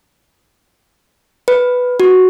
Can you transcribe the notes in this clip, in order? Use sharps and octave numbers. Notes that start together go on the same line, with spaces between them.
B4
F#4